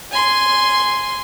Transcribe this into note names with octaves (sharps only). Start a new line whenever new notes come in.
G#5 C6